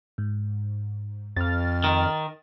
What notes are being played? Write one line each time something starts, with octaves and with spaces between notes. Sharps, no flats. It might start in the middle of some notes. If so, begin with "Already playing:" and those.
G#2
F2 F6 A6
D#3